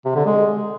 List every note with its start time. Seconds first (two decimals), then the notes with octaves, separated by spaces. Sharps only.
0.05 C3
0.15 D3
0.26 G#3